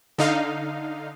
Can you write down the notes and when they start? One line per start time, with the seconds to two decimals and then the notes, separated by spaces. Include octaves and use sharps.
0.18 D3 D#4 F5